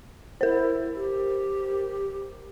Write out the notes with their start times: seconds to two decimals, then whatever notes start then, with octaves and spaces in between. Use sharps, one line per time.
0.41 E4 A#4 C5
0.95 G4